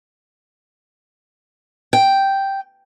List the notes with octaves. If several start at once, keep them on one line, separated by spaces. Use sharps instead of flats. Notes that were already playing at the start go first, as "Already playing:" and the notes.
G5